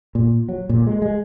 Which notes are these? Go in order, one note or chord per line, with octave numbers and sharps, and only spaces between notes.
A#2
F#3
A#2
G#3
G#3